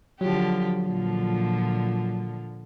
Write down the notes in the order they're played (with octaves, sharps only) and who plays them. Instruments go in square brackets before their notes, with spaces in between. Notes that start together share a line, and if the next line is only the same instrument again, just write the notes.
[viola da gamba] D3 F3 G4 [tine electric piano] F#3
[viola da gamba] A#2 D3 F3